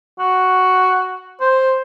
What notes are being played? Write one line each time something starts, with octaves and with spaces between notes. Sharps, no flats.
F#4
C5